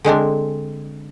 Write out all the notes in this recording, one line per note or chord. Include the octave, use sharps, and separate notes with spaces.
D3 G#3 C4 D4